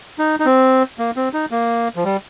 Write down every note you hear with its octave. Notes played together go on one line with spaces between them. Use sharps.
D#4
D#4
C4
A#3
C4
D#4
A#3
F3
G3